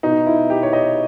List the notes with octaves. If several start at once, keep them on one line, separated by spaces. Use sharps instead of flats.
B2 D#4
E4
G4
C#5
D#5